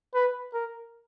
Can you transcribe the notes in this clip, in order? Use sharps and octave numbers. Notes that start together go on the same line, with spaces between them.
B4
A#4